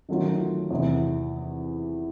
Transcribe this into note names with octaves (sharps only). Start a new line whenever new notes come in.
D#3 F#3 A3 C#4 F4
E2 C3 E3